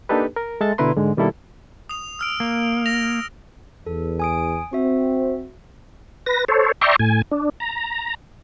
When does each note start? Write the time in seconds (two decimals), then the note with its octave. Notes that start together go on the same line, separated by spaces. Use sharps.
0.09 A#3 D4 D#4 G4 A4 B4
0.36 A#4
0.61 G#3 A4 E5 A5 A6
0.78 B2 D3 E4 B4 A#5 C6
0.97 G#2 D3 G#3
1.17 B2 D#3 G3 A#3 E4 A4
1.89 D#6 F7
2.19 E6 F6 D7
2.40 A#3
2.86 A#6 F7
3.86 E2 A4
4.20 G#5 D#6 D7
4.73 C4 F#4 E5
6.26 B4 A#6
6.48 A4 C5 C#5
6.81 D5 E5 G5 A#5 C6 C#6
6.99 A2 G#5
7.31 D4
7.60 A#5